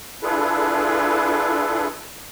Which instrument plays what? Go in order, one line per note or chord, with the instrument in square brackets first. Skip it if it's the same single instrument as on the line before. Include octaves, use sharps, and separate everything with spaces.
[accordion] D4 E4 F4 G#4 A4 B4